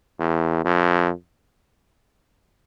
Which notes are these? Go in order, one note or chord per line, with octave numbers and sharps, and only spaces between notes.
E2
F2